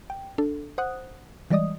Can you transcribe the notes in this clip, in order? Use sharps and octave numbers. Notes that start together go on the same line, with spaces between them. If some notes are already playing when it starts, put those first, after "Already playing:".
G5
D4 A4
C5 F#5 D#6 F#6
E3 G3 G#3 D5 D#5 D#6